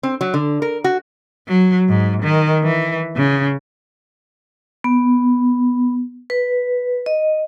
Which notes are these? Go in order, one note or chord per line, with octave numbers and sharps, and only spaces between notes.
C4
F#3
D3
A#4
F#4
F#3
G#2
D#3
E3
C#3
B3
B4
D#5